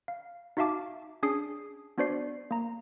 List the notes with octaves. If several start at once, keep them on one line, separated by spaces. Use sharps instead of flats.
F5
D#4 F#4 E5 F5 A5 D6
C#4 D4 G#4 D#6 C7
B3 D4 F#4 C5 D5 C7
A#3 A#5